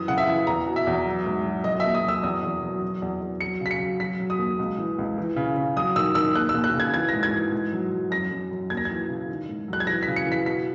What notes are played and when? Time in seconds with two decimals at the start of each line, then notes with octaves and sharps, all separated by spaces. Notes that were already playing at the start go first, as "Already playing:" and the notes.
Already playing: F#2 E3 D#6
0.08 C#3 F#5
0.18 E5
0.28 E3
0.47 E2 A#5
0.67 B2
0.76 E5
0.87 E2
1.07 F#3
1.26 G#2
1.45 F#3
1.64 F#3 D#5
1.75 D#5
1.80 D#2 E5
1.95 D#6
2.05 F#3 E6
2.23 E2 D#6
2.43 E2
2.63 F#3
2.82 F#3
3.02 E2
3.21 E2
3.41 F#3 C#7
3.61 C#3 B6
3.71 C#7
3.80 F#3
4.00 F#3 B6
4.20 F#3
4.30 D#6
4.39 D#2
4.59 C#2
4.78 E3
4.98 C#2
5.18 E3
5.36 C#3
5.57 C#3
5.76 F#3 D#6
5.96 D#3 E6
6.15 D#3 E6
6.35 D#2 F#6
6.49 E6
6.54 D#2
6.64 F#6
6.74 C#3
6.80 G#6
6.93 E3 G#6
7.09 G#2 A#6
7.23 G#6
7.33 E3
7.52 G#2
7.73 F#3
7.92 F#3
8.11 F#2 A#6
8.31 F#2
8.51 F#2
8.70 D#2 G#6
8.77 A#6
8.85 E3 G#6
9.09 C#3
9.28 D#3
9.49 G#2
9.68 F#3 F#6
9.80 G#6
9.87 E3 A#6
10.03 B6
10.08 C#3
10.16 C#7
10.27 E3
10.32 B6
10.46 B2 B6